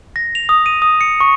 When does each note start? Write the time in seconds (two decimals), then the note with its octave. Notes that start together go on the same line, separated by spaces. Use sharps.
0.16 A#6
0.35 F7
0.49 D#6
0.66 D#7
0.82 D#6
1.01 C#7
1.20 C#6